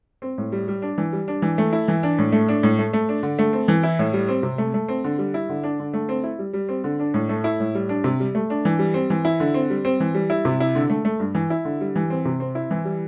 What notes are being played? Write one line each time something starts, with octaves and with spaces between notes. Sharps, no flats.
C4
A2
G3
G3
D4
E3
G3
D4
E3
A3
E4
E3
D4
A2
A3
D4
A2
A3
A3
D4
D3
A3
C4
E3
E4
A2
G3
C4
C3
A3
A3
C4
D3
G3
E4
D3
D4
D3
A3
C4
E4
G3
G3
C4
D3
D4
A2
A3
E4
A2
G3
D4
C3
G3
A3
D4
E3
G3
C4
E3
E4
D3
C4
G3
C4
E3
G3
E4
C3
E4
D3
A3
A3
G2
E3
E4
D3
G3
E3
C4
C3
C4
E4
E3
G3